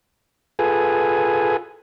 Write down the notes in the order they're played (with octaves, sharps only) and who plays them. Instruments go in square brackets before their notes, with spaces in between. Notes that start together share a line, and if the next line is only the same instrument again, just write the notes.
[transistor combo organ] F4 G#4 A4 B4 G#5